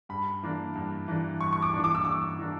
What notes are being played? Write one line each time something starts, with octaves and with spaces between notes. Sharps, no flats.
G2 B5
E3 A#3 D4
G2
E3 A#3 D4
G2 C#6
C#6
D6
E3 A#3 D4
D6
E6
G2 D6
E3 A#3 D4